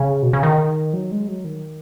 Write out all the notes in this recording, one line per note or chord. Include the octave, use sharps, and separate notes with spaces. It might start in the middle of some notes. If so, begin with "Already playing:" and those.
Already playing: C#3
B2
C#3
D#3
F#3
G#3
F#3
D#3